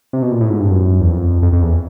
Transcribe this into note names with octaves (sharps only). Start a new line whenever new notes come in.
C3
B2
A#2
A2
G#2
G2
F#2
E2
F2
F2
F2
E2